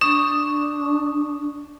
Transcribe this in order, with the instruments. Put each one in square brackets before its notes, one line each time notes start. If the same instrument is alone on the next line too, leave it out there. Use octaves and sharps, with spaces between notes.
[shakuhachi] D4 [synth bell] C#6 D#6 [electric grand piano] E7